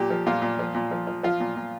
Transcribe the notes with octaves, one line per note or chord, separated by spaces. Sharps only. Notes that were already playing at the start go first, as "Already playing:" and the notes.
Already playing: A#2 G4
F3
A#2 F4
A#2
F3
A#2
F3
F3
F3 F4
A#2
A#2